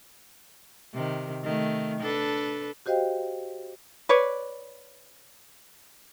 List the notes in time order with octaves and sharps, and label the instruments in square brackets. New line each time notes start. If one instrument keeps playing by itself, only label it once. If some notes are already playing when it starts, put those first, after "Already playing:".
[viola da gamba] C3 D#3
D#3 A3
D4 A4 B4
[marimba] F#4 G4 C5 D#5 F5 G5
[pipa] B4 C#5 D5